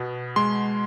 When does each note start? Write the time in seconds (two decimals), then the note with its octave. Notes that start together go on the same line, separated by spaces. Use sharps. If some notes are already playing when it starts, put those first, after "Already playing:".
Already playing: B2 B3
0.36 G#3 C6